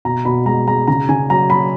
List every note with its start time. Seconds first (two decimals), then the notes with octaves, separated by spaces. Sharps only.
0.05 B2 A#5
0.25 B2 B5
0.46 G#3 A#5
0.68 G#3 A#5
0.88 C#3 A#5
1.09 C#3 G#5
1.30 F#3 A#5
1.50 F#3 B5